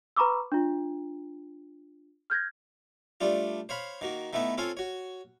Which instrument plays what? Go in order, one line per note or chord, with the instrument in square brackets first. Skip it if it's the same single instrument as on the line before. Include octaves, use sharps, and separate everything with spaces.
[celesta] B4 A#5 B5 C#6 D6 E6
D4 F4
F6 G6 G#6 A#6
[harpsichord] G3 A3 D4 F4
C5 C#5 F5 B5
D#3 A#3 F#4
D#3 A3 B3 E4 B4
C4 F4 A4 C#5 F5 G#5
F#4 C#5